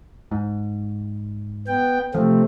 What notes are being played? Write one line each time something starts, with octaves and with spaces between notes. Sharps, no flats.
G#2
B3 G5
C3 F3 A3 C4